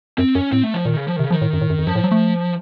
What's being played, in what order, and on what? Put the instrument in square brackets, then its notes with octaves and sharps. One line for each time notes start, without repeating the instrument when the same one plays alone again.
[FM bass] F#2 [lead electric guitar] C4
[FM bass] F#2 [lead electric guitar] C#4
[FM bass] A2 [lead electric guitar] C4
[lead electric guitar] A3
F3
[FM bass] A#2 [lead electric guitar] D#3
[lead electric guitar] C#3
F3
D#3
[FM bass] C3
[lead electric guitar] C#3
[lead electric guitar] D#3 [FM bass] F3
[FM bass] A2
F#2
A2
F#2
F2
[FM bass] F#2 [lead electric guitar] F3
[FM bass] A2
F#3
A3